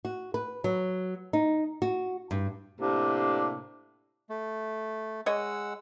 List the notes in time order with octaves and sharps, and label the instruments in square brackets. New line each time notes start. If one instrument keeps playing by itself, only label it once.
[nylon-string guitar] F#4
B4
F#3
D#4
F#4
G2
[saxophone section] A2 C3 A#3 D4
[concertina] A3
[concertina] G#3 F#5 E6 [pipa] C#5 D#5